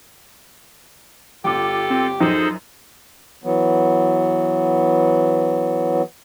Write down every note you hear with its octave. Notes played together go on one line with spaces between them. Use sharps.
G1 F4 G4 A4 D6
C4
F#2 F3 D#4 G#4 A4 C5
E3 F#3 B3